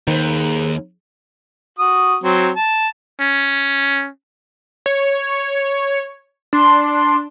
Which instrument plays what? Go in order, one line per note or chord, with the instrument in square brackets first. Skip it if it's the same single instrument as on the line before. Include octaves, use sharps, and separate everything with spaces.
[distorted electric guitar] D#2 [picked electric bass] D#3 [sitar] G#3 B4 C5
[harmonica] F#4 D#6
F#3 C4
A5
[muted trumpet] C#4
[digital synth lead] C#5
[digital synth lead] D4 [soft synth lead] C6